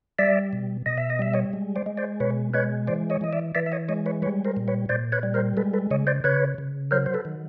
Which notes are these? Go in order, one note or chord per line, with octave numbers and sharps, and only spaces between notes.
G3 D5 E5
B2
B2 D#5
E5
D#5
G3 E5
C#5 D#5
G#3
C5 D5
G#3
C5 D5
B2 B4 C#5
G#3 B4 C#5
E3 C5 D5
C#5 D#5
E3 D#5
D5 E5
E3 D5 E5
E5
C#5 D#5
G#3 C#5 D#5
B4 C#5
G3 B4 C#5
A#4 C5
A#2
B4 C#5
A#2 C5 D5
B4 C#5
G3
A#4 C5
G#3 A4 B4
A4 B4
C#3 C#5 D#5
C5 D5
C#3 B4 C#5
C#3
F#3 A#4 C5
C5
A4 B4
D#3